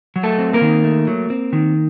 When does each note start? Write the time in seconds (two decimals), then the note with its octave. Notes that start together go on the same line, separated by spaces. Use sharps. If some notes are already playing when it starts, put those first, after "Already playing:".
0.16 F#3
0.23 A3 A4
0.38 C4
0.53 A#3 A#4
0.61 D#3
0.84 A3
1.07 F#3
1.30 C4
1.53 D#3